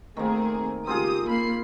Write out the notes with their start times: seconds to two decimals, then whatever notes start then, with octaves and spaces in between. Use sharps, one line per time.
0.17 D#3 A3 A#3 C4 G#4
0.87 C#2 C4 F4 G4 G#4 D#6
1.27 A#3 B5 C7